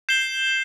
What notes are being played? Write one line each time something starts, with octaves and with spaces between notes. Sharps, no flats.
G6 C7 E7 G7